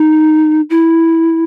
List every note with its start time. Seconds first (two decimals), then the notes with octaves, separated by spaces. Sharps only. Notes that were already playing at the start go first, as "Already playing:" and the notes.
Already playing: D#4
0.70 E4